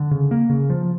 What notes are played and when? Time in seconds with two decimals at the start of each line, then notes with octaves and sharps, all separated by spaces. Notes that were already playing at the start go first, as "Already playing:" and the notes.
Already playing: D3
0.11 C#3
0.31 A#3
0.50 C#3
0.70 F3